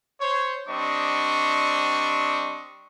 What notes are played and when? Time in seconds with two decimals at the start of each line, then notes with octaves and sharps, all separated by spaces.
0.21 C5 C#5
0.67 G3 C4 D4 D#5 C#6